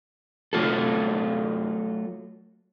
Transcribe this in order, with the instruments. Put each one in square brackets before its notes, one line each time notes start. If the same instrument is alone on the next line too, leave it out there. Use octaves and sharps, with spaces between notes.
[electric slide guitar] F#3 A3 F4 A4